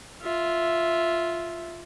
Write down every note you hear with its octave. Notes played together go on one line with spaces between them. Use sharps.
F4 E5